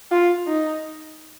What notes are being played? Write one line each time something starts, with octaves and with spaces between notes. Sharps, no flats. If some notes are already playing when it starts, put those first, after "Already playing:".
F4
D#4